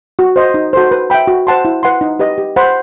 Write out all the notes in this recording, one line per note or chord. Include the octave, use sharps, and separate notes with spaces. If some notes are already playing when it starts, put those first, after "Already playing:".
F#4
C5 D#5
D#4
F#4 A4 C5
B4
E5 G5 B5
F#4
C5 F#5 A5 C6
E4
B4 F#5 C6
D#4
G4 B4 D#5
G4
C5 F#5 B5